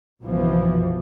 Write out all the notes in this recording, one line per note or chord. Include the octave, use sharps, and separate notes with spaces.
F#1 B1 B2 E3 F3